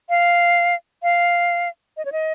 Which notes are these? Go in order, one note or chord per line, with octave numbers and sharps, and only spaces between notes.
F5
F5
D#5
C#5
D#5